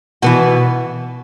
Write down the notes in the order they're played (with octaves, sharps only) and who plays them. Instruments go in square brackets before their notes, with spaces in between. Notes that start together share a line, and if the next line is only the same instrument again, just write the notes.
[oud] B2 [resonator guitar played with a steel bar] E3 B3 F#4